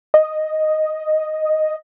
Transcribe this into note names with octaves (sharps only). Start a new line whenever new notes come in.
D#5